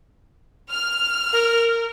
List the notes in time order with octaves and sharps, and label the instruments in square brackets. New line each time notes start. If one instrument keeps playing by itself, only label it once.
[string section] F6
[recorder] A#4